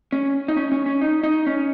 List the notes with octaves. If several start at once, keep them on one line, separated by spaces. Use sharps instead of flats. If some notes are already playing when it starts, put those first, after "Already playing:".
C#4
D#4
C#4
C#4
C#4
D#4
D#4
C#4